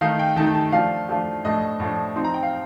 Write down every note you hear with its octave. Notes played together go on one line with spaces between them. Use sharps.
D#3 A3 D#4 F5
G5
D#3 A3 D#4 A5
A5
F3 A3 D4 F4 F5
F3 A3 D4 F4
A2 F3 A3 D4 D#5
A5
A2 F3 A3 D4
F3 C4 D#4 C6
A#5
G5
F5